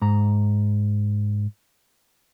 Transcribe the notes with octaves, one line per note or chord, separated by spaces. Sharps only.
G#2 A#5